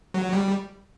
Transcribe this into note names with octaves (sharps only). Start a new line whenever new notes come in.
F#3
G3